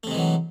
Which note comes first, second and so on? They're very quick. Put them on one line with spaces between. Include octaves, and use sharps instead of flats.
A3 C3 G#3 E3 F#3